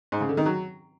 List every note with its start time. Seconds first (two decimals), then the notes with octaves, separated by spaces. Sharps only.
0.12 G#2
0.21 C#3
0.29 D3
0.37 D#3
0.46 F#3